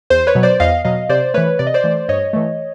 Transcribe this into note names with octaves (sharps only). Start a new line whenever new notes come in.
E2 C5
B4 C#5
B2 F#3
C5 D5
E2 D#5 F5
B2 F#3 D#5 F5
C3 C5 D5
E3 A3 B4 C#5
C3 D5
D#5
C5 D5
E3 A3
G2 C#5 D#5
E3 A3